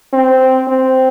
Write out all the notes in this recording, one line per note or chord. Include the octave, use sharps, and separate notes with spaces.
C4
C4